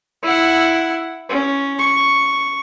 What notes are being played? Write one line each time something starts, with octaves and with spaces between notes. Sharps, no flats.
E4 F#5
C#4
C#6